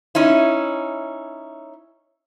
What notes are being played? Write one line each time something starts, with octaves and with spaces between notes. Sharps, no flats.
C#4 D#4 E4